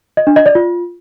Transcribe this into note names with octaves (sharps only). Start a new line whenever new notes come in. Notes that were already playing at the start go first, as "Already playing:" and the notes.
D#5
D4
D#5
D5
F4